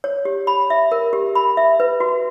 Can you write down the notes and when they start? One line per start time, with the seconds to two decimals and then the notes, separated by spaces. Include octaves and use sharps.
0.04 C#5
0.25 G4
0.47 B5
0.70 E5
0.92 A#4
1.13 G4
1.35 B5
1.57 E5
1.80 B4
2.00 F#4